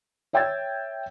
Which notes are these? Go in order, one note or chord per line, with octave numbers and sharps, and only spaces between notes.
C#5 E5 G5 E6 G#6 A6